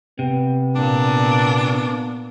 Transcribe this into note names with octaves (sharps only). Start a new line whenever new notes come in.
C3 B3
A#2 D4